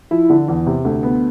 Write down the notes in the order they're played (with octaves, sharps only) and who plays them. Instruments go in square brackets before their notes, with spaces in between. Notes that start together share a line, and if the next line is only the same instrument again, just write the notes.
[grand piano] F3 [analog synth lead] E4
[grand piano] D3
E2
C3
D2
B3